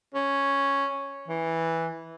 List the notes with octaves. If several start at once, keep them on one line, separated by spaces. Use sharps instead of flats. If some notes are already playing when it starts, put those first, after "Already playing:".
C#4
E3